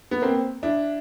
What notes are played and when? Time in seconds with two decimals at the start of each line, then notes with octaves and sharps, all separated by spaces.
0.11 B3
0.22 A#3 C4
0.63 D4 E4